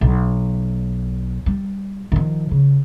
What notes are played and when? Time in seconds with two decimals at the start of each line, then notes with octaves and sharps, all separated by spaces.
0.01 B1
1.46 G3
2.12 D#3 F3
2.51 C#3